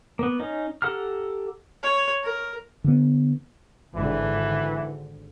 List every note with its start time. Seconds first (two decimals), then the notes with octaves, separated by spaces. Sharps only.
0.19 A#3 B3
0.40 C#4 D#4
0.82 G4 A4 F#5 A#5 F6
1.83 C#5
2.23 A#4
2.84 D3 B3
3.95 G#1 D3 E3